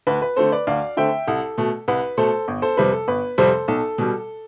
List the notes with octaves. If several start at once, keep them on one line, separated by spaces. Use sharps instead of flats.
D2 B4
B4
D3 A3 C4 A4 C5
B4 D5
D2 D5 F5
D3 A3 C4 E5 G5
C2 A4
B2 A3
C2 B4
B2 A3 A4 C5
G1
A4 C5
F2 C3 G3 C4 B4
A4
G1 B4
F2 C3 G3 C4 A4 C5
B1 A4
B2 G3